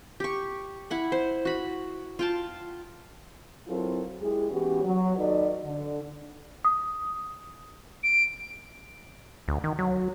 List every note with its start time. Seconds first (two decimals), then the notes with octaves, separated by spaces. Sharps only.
0.20 G4 C#6
0.90 E4 F#5 B5
1.12 C5
1.45 F#4 B5
2.19 F4 G5 A5
3.67 F#3 C4 E4 F4 A4 A#4
4.21 G#3 E4 G4 G#4
4.50 E3 B3 C#4 F#4 G4
4.84 F#3
5.17 D#2 D#4 F#4 A4 B4 D5
5.64 D3
6.65 D#6
8.03 D7
9.48 D2
9.64 D#3
9.79 F#3